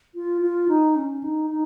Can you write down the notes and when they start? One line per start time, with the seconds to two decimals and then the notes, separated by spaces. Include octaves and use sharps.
0.15 F4
0.42 F4
0.68 D#4
0.96 C#4
1.24 D#4
1.50 D#4